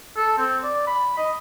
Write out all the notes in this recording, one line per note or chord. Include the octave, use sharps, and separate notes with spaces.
A4
C4
D5
B5
D#5